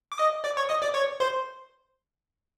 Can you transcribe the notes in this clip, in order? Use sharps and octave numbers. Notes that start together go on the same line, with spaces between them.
D6
D#5 D#6
D5 D6
C#5 C#6
D#5 D#6
D5 D6
C#5 C#6
C5 C6